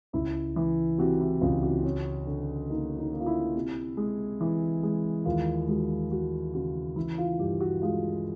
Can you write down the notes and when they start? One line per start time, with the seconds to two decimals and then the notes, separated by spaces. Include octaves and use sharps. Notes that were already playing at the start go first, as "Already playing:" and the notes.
0.13 C#2 E4
0.56 E3
0.98 C3 F#4
1.20 E4
1.41 C#2 F4
1.63 F#4
1.84 C#4
2.27 D3
2.70 A#3 D#4
2.98 D#4
3.13 A#3
3.20 F4
3.26 E4
3.56 C3
3.97 G#3
4.41 E3
4.83 G#3
5.25 D#2 F4
5.68 G#3 F#4
6.11 G#3 F#4
6.54 C#3 F#4
6.96 E3 E4
7.18 F4
7.39 G2 G4
7.61 F#4
7.82 G#3 F4